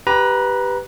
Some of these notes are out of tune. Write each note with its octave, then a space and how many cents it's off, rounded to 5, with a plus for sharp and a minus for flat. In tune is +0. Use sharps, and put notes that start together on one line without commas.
G4 +0 B4 +0 A#5 +25